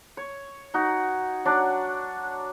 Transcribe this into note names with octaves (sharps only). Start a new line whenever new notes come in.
C#5
D#4 F#4
F#3 D4 F#4